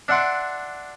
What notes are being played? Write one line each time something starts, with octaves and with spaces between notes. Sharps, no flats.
D4 E5 F#5 C6 D6